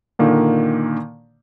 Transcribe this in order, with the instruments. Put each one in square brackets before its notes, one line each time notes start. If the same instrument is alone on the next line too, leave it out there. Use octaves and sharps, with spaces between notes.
[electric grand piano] A#2 D3 D#3 A#3